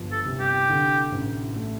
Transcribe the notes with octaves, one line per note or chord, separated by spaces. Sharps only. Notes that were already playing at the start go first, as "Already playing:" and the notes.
Already playing: G1 F3
A4
C2
G4
D3
A1
A3